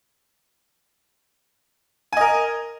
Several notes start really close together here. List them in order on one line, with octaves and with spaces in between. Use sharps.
G#5 D#5 A#4